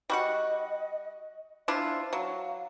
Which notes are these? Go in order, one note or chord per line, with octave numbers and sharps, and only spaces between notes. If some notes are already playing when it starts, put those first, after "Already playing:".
G3 F#4 D#5 F#5
D4 E4 F4 C5
F#3 F5